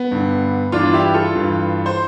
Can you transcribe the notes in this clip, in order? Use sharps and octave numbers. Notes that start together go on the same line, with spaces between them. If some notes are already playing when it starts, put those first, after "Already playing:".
Already playing: B3
G2 D3
G2 E3 D4 F4
E4 G4
F4 A4
G2 E3
C5